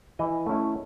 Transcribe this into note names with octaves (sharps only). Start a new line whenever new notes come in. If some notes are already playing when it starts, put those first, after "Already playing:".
E3 D#5
A3 C#4 E4